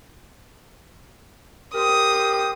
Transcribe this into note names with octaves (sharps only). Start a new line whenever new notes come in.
G4 A#4 C5 D#6